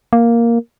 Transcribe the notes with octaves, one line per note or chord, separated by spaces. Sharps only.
A#3